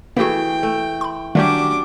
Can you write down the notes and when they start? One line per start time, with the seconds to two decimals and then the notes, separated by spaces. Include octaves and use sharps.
0.17 E3 A3 A#3 F#4 G#4 G5
0.63 A3
1.01 B5 C6
1.35 D#3 F#3 G3 A3 C#4 D4 G4 D6